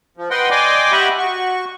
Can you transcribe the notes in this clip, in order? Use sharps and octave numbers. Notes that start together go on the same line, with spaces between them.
F3
B4 D#5 F#5 G5 C6
D5 D#5 G5 G#5 C6 D6
G4 D#5 E5 F#5 B5 C#6
F#4 C#6